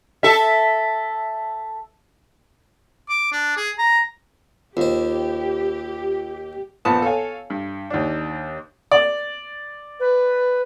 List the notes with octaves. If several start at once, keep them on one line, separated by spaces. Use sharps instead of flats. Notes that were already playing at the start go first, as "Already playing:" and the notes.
A4 E5
D6
D4
G#4
A#5
D#2 F4 G4 C5
A#1 F3 B3 B4 A5 D#6
A4 C#5 F5 G#5
G2
D#2 D4
D5
B4